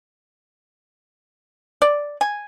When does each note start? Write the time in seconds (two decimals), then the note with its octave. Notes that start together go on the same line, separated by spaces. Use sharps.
1.82 D5
2.21 G#5